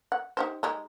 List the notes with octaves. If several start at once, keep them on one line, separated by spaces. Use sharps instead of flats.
F#5
D#4 G4 C5
G3 G#3 D#4